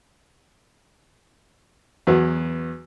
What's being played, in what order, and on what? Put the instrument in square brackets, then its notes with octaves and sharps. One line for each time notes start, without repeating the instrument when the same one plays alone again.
[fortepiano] E2 F#3 B3 B4